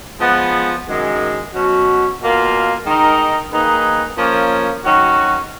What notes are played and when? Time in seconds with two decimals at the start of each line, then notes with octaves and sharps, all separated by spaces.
0.20 F3 G#3 B3
0.87 F#2 D#3 G#3
1.53 B2 F#3 C#4 F#4
2.19 B2 A#3 F4
2.85 D#3 G#3 D#4 A#4
3.52 D#3 A#3 D#4 G#4 B4
4.17 F3 A#3 C#4
4.83 D#3 F#3 C#4 F#4